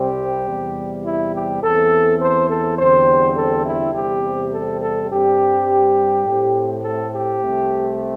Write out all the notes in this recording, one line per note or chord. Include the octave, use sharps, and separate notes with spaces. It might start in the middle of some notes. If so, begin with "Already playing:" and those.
Already playing: C2 C3 G3 C4 G4
E2 C3 G3
E4
G4
E2 E3 C4 A4
C5
A4
E2 D3 G3 C4 C5
A4
E4
E2 C3 G3 C4 G4
A4
A4
G2 G3 C4 G4
A2 A3 C4
A4
G4
C2 C3 A3 C4